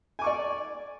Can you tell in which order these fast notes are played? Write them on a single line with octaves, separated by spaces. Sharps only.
G#5 D6 C#6 D5